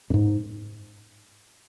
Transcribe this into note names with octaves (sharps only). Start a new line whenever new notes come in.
F#2
G#2